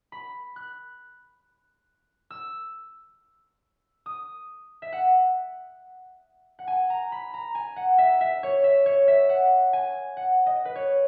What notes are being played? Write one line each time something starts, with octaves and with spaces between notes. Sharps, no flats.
B5
F#6
E6
D#6
E5
F#5
F#5
G#5
A#5
B5
A#5
G#5
F#5
E5
E5
C#5
E5
C#5
E5
F#5
G#5
F#5
D#5
B4
C#5